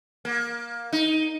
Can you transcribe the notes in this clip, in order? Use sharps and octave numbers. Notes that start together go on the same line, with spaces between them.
A#3
D#4